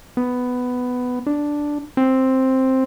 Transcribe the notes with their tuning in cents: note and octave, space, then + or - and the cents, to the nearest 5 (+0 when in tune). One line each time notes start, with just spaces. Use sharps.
B3 +10
D4 +0
C4 +5